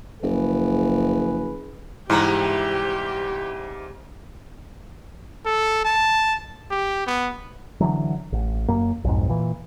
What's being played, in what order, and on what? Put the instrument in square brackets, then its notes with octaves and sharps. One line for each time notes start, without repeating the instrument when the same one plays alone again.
[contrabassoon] F#1 [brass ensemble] F3 G#4 B4
[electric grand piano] G#2 [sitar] C3 E3 G3 [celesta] E4 A#5 [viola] G4
[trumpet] A4
A5
G4
B3
[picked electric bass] D3 E3 F#3
A1
F#1 F#2 A#3
B1 F2 G#2
A#2 E3